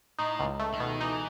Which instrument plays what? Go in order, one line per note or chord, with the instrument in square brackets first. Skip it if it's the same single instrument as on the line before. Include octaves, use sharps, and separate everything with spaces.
[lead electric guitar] A2 [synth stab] D#4
[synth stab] C#2
A3
[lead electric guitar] D#3
[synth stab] B2
[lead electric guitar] E3 [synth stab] D#4